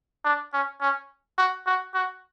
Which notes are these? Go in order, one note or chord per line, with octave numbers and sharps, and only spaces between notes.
D4
C#4
C#4
F#4
F#4
F#4